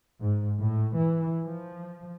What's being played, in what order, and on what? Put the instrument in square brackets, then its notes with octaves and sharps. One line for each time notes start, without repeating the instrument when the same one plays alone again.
[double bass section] G#2
A2
E3
F3